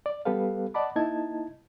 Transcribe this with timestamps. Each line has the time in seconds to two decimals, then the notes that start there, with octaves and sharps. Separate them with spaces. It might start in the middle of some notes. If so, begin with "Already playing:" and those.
0.06 D5
0.25 G3 B3 G4 A4 B4 F5
0.74 D5 D#5 F#5 A5 B5 D6
0.96 A#3 D#4 E4 D#5 A5 G#6